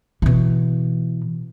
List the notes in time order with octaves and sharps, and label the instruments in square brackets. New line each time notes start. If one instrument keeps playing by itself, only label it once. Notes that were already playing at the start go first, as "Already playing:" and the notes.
[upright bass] B2 E3